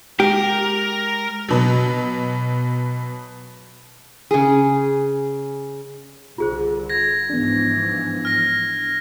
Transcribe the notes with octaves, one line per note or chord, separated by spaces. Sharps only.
G#3 G4 A#4
B2 F#3
C#3 G#4
C2 D3 F4 G#4 C5
G#6 A#6
G#2 E3 F3 B3 D4
F6 A#6